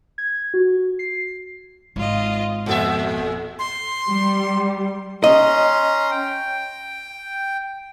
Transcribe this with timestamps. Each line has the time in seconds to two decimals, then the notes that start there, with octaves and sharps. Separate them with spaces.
0.18 G#6
0.54 F#4
0.99 C7
1.96 G#1 F4 D#5
2.66 F2 A#2 A4 E5
3.59 C6
4.11 G3
5.24 C#4 D#5 A#5 C6
6.11 G5